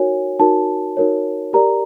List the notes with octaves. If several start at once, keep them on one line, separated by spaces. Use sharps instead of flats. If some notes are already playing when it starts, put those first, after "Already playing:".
Already playing: D#4 F#4 A#4 C#5 G#5
D#4 F#4 A#4 C#5 A5
D#4 F#4 A#4 C#5
G4 A#4 D5 A#5